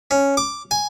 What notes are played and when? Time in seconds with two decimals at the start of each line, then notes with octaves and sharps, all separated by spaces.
0.11 C#4
0.37 D6
0.71 G#5